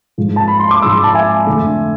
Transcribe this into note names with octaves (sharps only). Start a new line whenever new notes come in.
G#2 F3 G#3
A5
B5
C6
D6
G#2 F3 G#3 C6 E6
A5
E5 G#5
F2 D3 A3